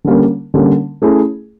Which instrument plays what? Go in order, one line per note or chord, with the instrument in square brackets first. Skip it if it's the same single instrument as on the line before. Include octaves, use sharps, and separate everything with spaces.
[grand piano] D3 G3 A#3 C#4
D3 G3 A#3 C#4
A3 C#4 E4 G#4